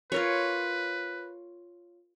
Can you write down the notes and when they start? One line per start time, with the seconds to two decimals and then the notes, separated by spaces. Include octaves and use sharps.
0.12 F4 A#4 B4 C#5